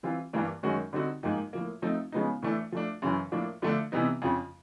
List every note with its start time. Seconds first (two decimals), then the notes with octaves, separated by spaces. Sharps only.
0.03 E3 G3 C4 F4
0.33 G2 E3 G3 A#3 D4
0.63 F#2 D#3 G#3 C#4 F#4
0.93 D3 G3 C4 D#4 F#4
1.23 G#2 F3 A#3 D#4 G4
1.53 A2 F3 A#3
1.82 F3 A3 C4 D#4
2.12 C#3 F3 G#3 B3 D#4
2.42 A2 E3 A3 D4
2.72 F3 A3 D4
3.02 F#2 C#3 E3
3.32 A2 F3 A#3 D4
3.62 D3 F3 A3 D4 F4
3.92 C3 E3 G3 B3 D#4
4.22 F2 C#3 F3